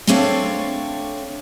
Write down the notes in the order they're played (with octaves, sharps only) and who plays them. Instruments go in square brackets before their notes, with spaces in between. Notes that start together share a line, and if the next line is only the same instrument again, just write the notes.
[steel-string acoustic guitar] A3 C4 D4 A4 C#5 F5